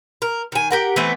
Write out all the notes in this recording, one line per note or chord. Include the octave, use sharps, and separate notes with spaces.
A#4
D#3 G#5
G4 A#4 F#5
E3 A3 B3 C4